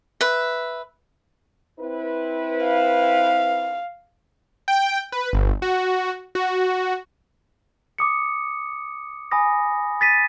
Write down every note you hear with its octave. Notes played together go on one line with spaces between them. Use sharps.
B4 E5
C4 E4 B4
F5
G5
B4
G1
F#4
F#4
D6 D#6 C#7
G#5 B5 D#6 A#6
A6 B6 D#7